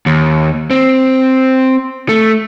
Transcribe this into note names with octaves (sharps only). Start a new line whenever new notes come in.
D#2
C4
A3